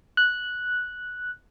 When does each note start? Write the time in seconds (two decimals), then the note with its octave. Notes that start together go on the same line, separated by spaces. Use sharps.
0.17 F#6